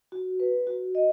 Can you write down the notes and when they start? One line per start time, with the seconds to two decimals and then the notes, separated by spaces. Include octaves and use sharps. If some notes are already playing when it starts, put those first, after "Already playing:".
0.12 F#4
0.40 B4
0.67 F#4
0.95 D#5